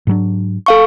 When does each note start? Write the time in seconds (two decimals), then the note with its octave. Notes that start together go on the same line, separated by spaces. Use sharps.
0.07 G#2 F#3 D4
0.66 A4 F5 C#6